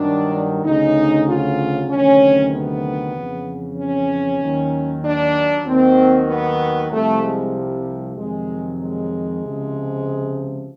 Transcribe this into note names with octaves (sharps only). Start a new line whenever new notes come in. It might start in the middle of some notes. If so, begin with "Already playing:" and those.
Already playing: G2 D#3 F#3 D4
D2 C#3 F#3 D#4
F4
D2 C3 D#3 F#3 C#4
B3
F2 C#3 E3
C#4
D#2 D#3 F#3
D4
D#2 D#3 F#3 C4
B3
C2 C3 F3 A3
G#3
G3
F2 C3 D#3 F#3 G#3
G#3
C#2 C3 F3